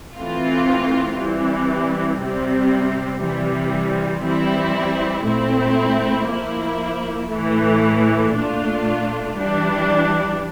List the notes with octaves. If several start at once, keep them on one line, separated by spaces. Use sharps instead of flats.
E3 A3 C4 F4
E3 G3 C4
C3 G3 C4
C3 E3 G3
E3 G3 C4 E4
A#2 A3 C4 E4
F3 A#3 E4
A2 E3 A3
A#2 A3 D4 F4
E3 G3 D4